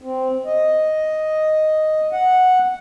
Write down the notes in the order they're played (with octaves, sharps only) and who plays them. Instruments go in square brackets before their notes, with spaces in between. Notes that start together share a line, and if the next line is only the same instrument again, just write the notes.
[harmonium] C4
D#5
F#5